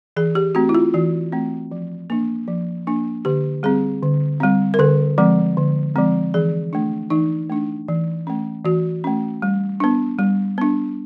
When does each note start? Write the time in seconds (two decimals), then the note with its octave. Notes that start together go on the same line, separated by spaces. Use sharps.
0.16 E3 G#4
0.35 G4
0.55 A3 C4 F#4
0.69 E4
0.75 F4
0.94 E3 F#4
1.32 A3 C4
1.71 F3
2.10 A#3 D4
2.48 F3
2.87 A#3 D4
3.25 D3 G4
3.63 G3 C4 G#4
4.03 D3
4.40 G3 C4
4.74 A#4
4.79 D3 A4
5.18 F3 G#3 C4
5.57 D3
5.96 F3 G#3 C4
6.34 E3 G#4
6.73 A3 D4
7.10 E3 D#4
7.50 A3 D4
7.88 E3
8.27 A3 C#4
8.65 E3 F#4
9.04 A3 C#4
9.42 G3
9.80 B3 D4
10.19 G3
10.58 B3 D4